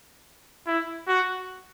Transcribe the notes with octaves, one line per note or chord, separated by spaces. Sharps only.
E4
F#4